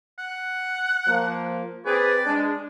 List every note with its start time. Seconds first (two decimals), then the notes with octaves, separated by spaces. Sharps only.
0.19 F#5
1.07 F3 A#3
1.85 C4 G#4 B4 D5
2.26 G#3 D4